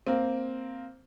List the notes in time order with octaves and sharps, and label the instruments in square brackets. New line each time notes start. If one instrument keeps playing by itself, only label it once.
[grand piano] A#3 C4